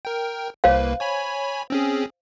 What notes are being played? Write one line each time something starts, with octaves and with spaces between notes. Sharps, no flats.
A#4 G5
C2 A#3 B4 C5 F5
C#5 G#5 B5
C4 C#4 G#4